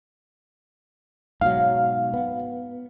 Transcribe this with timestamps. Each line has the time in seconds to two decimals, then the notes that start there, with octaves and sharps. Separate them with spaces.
1.41 G#2 B2 F#3 F5
2.14 B3